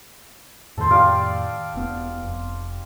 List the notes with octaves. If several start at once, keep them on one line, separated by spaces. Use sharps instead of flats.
F2 A2 D#3 A4 C5
G4 D5 F5
E1 B3
F1